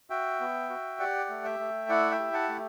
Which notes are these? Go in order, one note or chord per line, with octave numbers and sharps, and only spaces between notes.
F#4 E5 G5
B3
F#4
G4 D5 F#5
A3
E5 G5
A3
E4 D5 F#5
E5 G5
G4
F#5 A5
A3